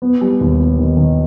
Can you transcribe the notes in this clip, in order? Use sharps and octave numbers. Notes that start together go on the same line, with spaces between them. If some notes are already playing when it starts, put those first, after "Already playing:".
B3
G3
D#2
B3
D#3
D#3